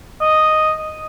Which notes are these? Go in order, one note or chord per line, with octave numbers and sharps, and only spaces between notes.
D#5